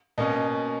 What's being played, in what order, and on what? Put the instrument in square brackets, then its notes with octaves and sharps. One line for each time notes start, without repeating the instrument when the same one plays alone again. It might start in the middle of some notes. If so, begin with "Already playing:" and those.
[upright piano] B2 A#3 C#4 D#5